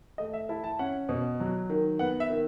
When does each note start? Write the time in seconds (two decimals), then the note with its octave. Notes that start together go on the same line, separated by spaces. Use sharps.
0.18 A3 D#5
0.33 E5
0.49 E4 A5
0.64 A5
0.79 C#4 F#5
1.09 B2
1.40 F#3
1.70 D#3
1.99 B3 F#5
2.20 E5
2.30 D#3